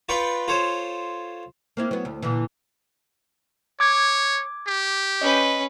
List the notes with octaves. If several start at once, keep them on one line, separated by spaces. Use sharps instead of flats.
F4 B4 D5 G5 C#6 D6
F4 A4 C5 C#5
A#3 C4 E4
F#3 B3
D2
A#2 D3 E3
C#5 D6 G#6
G4
C#4 B4 D#5